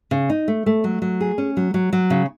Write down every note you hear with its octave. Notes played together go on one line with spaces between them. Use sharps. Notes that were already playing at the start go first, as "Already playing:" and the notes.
C#3
D#4
A3
A3
F#3
F#3
G#4
C#4
F#3
F#3
F#3
C#3